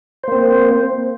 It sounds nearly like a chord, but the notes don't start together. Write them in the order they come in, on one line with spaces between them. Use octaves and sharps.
C5 A#3 C4